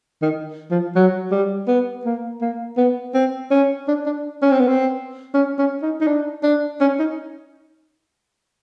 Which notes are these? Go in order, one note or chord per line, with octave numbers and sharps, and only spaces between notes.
D#3
F3
F#3
G3
B3
A#3
A#3
B3
C4
C#4
D4
D4
C#4
C4
B3
C4
C#4
C#4
D#4
D#4
D4
D4
C#4
D#4